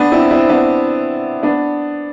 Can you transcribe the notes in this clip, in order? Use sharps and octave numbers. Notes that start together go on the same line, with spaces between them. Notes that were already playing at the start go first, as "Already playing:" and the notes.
Already playing: B3 D4
C4 E4
C4 E4
B3 D4
B3 D4